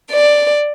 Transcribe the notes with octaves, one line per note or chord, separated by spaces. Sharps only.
D5